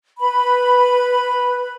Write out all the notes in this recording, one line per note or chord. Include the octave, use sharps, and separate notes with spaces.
B4 B5